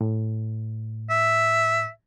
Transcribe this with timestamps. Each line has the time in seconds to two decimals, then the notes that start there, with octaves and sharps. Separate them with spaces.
0.01 A2
1.10 E5